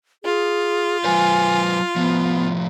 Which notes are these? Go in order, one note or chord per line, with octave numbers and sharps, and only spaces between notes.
F4 G#4
F#3 B4 C5 G#5
A2 F3 B3